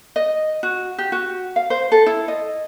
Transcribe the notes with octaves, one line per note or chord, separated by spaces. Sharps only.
D#5
F#4
G4
F#4
F5
C5
A4
E4
D#5